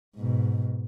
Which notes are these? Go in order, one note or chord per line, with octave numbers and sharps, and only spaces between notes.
G#2 B2